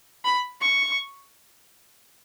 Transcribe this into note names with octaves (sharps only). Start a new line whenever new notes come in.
B5
C#6